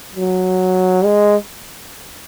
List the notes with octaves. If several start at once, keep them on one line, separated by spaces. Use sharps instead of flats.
F#3
G#3